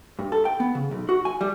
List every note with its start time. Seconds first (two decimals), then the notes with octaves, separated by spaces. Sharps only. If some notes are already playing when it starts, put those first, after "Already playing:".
0.19 G2
0.32 A4
0.45 G5
0.60 B3
0.75 C#3
0.91 B1
1.09 F#4
1.25 G#5
1.41 G3